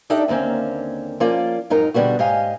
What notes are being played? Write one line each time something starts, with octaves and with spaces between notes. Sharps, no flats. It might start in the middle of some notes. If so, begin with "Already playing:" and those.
D4 D#4 G4 A4 D5 E5
D#2 D3 A#3 C4 C#4
F3 A#3 C#4 F4 D5
F2 G#2 F#3 D#4 A#4
B2 D3 G3 B3 F#4
G#2 G4 D#5 F5 G#5